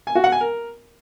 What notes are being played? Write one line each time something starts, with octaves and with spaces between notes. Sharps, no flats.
G#5
F#4
F#5
G#5
A#4